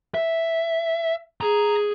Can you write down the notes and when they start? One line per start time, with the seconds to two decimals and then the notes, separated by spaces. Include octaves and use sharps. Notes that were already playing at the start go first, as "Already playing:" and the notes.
0.14 E5
1.41 G#4 A#5